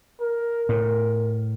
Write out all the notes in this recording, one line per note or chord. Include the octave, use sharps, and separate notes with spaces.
A#4
A2 A#4